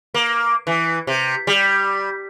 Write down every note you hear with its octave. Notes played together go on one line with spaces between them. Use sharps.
A#3
E3
C3
G3